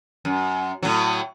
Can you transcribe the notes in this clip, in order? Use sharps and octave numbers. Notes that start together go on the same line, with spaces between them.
F#2
A2 F#3